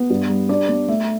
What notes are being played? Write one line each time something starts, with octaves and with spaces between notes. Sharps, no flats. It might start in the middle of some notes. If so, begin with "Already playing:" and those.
Already playing: B3 B4
G2
G3
D4 D5
B3
A3 E5